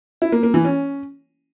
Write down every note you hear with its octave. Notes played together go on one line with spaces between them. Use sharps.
E4
A#3
A#3
E3
C#4